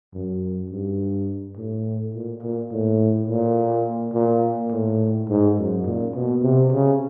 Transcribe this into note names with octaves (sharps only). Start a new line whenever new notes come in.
F#2
G2
A2
A#2
A#2
A2
A#2
A#2
A2
G#2
F#2
A#2
B2
C3
C#3